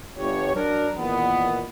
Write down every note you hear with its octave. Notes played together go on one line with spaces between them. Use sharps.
G1 G4 C#5
F#3 D4 A#4
E2 A#2 D#3 B3